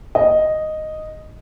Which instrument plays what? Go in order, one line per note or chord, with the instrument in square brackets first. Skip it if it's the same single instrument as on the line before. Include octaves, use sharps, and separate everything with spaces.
[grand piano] D#5